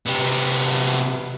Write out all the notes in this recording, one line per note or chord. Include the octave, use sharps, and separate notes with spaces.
C3 B3